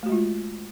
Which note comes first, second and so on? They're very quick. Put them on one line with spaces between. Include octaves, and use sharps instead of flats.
A3 F#4 G#3 F4